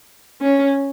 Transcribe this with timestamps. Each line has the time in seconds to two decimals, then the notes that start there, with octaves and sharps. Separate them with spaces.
0.42 C#4